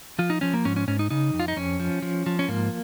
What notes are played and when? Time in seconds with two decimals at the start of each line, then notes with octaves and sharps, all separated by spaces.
0.19 F3 F4
0.30 D#4
0.41 F3 C#4
0.54 A#3
0.65 G#2 C#4
0.76 C#4
0.88 G#2 C#4
0.99 D#4
1.10 C#3 D#4
1.34 F2
1.40 F4
1.48 D#4
1.56 F2 C#4
1.80 F3
2.02 F3
2.26 F3
2.39 C#4
2.48 G#2 A#3